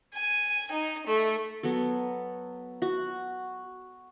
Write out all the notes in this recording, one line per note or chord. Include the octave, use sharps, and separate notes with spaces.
G#5
D#4
A3
F#3 B3 A4
F#4